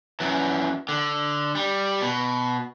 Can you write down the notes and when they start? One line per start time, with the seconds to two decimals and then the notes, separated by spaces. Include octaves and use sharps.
0.20 F#2 E3
0.89 D3
1.55 G3
2.01 B2